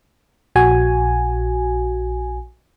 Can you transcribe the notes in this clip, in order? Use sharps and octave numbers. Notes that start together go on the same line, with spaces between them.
A#1 F#4 G#5